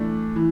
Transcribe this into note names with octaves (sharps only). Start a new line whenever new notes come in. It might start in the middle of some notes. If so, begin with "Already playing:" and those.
Already playing: E3 A3 D4
E3